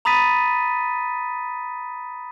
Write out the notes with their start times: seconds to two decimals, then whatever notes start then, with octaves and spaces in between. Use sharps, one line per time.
0.05 A#5 B5 D#6 A6 B6 D#7